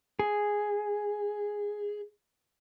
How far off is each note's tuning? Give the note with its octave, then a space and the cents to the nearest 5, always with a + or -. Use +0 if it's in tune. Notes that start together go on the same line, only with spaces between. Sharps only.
G#4 -5